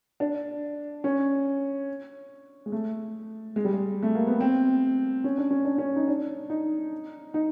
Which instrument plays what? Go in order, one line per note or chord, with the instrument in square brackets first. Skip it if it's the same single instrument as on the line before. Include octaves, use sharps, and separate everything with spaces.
[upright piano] D4
C#4
G#3
A3
G#3
G3
G#3
A3
A#3
B3
C4
C#4
D4
C#4
D4
C#4
D#4
D4
D#4
D#4